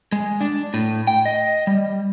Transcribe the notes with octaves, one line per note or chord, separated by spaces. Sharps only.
G#3
D4
A2
G5
D#5
G3